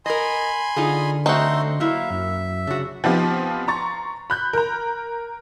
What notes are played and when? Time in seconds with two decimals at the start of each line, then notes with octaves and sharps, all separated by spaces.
0.06 A#4 D#5 G#5 B5 C6
0.76 D3 D#4 F4 G#4
1.26 A3 C4 D#4 F#4 C5 C6
1.80 F#3 A#3 E4 E5 F5
2.11 F#2
2.67 C#3 D4 F#4
3.04 F3 B3 C4 D#4 F4 G4
3.68 A#5 C6 C#6 A6
4.30 B5 F#6 G6
4.53 A#4 A#5